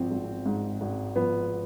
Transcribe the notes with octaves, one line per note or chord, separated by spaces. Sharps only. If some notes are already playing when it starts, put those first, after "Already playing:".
Already playing: G#1 F3 C4
G#1
G#2
G#1
F3 B3